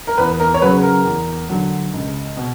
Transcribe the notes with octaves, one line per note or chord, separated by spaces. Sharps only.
A#4
E2 B4
A#4
C#5
C#3 F#3 B4
A#4
E2
D3 F#3
C#2
B2